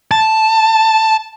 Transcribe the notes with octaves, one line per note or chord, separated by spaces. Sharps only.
A5